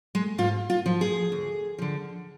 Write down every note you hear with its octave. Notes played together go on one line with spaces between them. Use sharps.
G#3
G#2 F4
F4
F3
G#4
D2
D3 F3